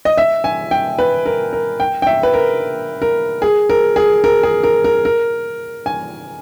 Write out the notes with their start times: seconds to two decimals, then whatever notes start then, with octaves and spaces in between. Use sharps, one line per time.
0.05 D#5
0.18 E5
0.44 G#5
0.71 G5
0.99 B4
1.26 A#4
1.53 A#4
1.80 G5
2.02 G5
2.07 E5
2.23 B4
2.34 A#4
3.02 A#4
3.42 G#4
3.70 A#4
3.96 G#4
4.24 A#4
4.43 G#4
4.63 A#4
4.84 A#4
5.05 A#4
5.86 G#5